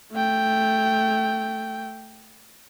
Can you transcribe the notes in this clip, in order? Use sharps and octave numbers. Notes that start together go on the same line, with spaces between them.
A3 G5